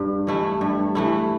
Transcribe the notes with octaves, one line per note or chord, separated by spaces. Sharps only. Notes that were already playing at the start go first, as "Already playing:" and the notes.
Already playing: G2
E3 A3 E4
G2
E3 A3 E4